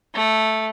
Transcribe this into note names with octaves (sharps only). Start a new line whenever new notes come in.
A3